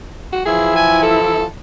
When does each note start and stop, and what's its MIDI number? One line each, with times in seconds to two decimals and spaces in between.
0.32 0.44 66
0.45 1.45 52
0.45 1.45 53
0.45 1.45 64
0.45 0.74 68
0.76 0.98 80
1.02 1.44 69